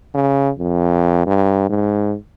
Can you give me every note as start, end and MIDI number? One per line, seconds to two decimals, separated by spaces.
0.14 0.50 49
0.58 1.23 41
1.26 1.66 43
1.69 2.16 44